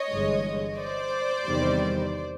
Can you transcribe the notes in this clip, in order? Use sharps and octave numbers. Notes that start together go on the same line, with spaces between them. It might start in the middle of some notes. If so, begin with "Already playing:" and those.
Already playing: C#5 D#5
G1 G2 E3 G#3
C5 D5
E2 C3 D#3 G3